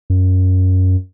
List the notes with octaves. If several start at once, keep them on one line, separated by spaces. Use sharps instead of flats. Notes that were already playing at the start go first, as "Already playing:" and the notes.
F#2